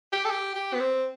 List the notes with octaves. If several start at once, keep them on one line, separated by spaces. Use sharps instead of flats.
G4
A4
G4
G4
B3
C4